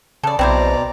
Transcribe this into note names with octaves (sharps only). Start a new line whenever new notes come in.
C#3 A4 D5
B1 B2 C4 E4 C5 D5 A#5